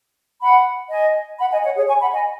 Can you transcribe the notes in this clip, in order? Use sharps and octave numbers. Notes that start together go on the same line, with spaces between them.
F#5 B5
D#5 G#5
F#5 B5
D#5 G#5
C#5 F#5
G#4 C#5
G#5 C#6
F#5 B5
D#5 G#5